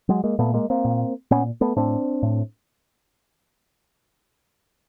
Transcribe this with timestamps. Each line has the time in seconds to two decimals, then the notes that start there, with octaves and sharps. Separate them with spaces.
0.09 F#3 G#3
0.24 G#3 A#3
0.39 A#2 A3 B3
0.54 G#3 A#3
0.70 A#3 C4
0.85 A#2
1.31 A#2 B3 C#4
1.61 A3 B3
1.76 A2 C4 D4
2.23 A2